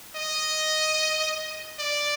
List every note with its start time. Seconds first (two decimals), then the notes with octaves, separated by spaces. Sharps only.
0.16 D#5
1.79 D5